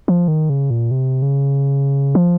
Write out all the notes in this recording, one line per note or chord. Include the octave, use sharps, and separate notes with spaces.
F3
D#3
C#3
A#2
C3
C#3
F3